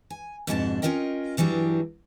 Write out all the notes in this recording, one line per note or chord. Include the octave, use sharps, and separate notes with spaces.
G#5
F2 G#2 B2 D4 A5
C#4 D4 F4 A#4 D#5 G5
G2 E3 F#3 G3 D4